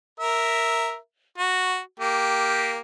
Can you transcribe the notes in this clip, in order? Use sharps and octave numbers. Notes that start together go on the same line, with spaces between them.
A#4 E5
F#4
A#3 G4